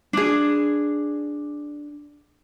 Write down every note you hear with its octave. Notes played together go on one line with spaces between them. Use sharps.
D4 G#4